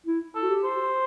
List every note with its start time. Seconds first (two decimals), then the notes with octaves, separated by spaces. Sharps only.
0.06 E4
0.35 A4
0.43 F#4
0.50 G4
0.64 C5